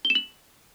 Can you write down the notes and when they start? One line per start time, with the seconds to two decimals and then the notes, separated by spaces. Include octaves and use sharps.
0.05 G7
0.10 E7
0.15 F#7